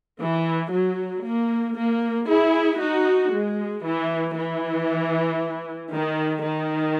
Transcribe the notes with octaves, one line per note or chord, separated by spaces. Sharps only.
E3
F#3
A#3
A#3
E4 G#4
D#4 F#4
G#3
E3
E3
D#3
D#3